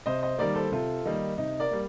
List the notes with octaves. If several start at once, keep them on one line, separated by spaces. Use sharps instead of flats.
C3 C5 D#5
C5 D#5
D#3 G3 A#3 A#4 D5
A4 C5
C3 F4 A4
D#3 G3 A#3 D#4
C3 D#4
A#4 D5
G3 A#3